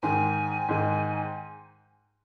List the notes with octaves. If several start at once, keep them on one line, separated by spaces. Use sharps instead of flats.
G#2 D#3 G#3 G#5
G#2 D#3 G#3